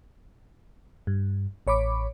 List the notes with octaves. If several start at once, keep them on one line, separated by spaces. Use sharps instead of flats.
G2
A1 C#5 B5 D6